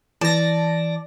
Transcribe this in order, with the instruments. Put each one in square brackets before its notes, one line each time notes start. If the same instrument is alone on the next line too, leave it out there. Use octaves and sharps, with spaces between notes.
[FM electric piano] E3 [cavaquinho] D5 [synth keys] A5 A#6